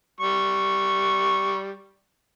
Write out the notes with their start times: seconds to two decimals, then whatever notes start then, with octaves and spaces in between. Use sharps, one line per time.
0.21 G3 C#6